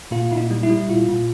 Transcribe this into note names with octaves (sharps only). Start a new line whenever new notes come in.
A#2 F4
A#2 E4
D#4
G3
E4
G3
A#2 F4
A#2